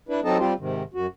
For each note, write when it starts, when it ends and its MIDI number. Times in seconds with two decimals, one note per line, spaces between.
0.09 0.20 62
0.09 0.20 64
0.09 0.20 71
0.24 0.38 54
0.24 0.38 60
0.24 0.38 63
0.24 0.38 69
0.24 0.38 75
0.24 0.38 81
0.38 0.53 55
0.38 0.53 60
0.38 0.53 65
0.38 0.53 67
0.38 0.53 72
0.59 0.83 44
0.59 0.83 48
0.59 0.83 51
0.94 1.06 42
0.94 1.06 66